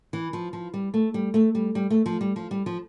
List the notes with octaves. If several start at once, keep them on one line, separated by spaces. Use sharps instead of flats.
E3
F3
F3
G3
A3
G3
A3
G3
G3
A3
F3
G3
F3
G3
F3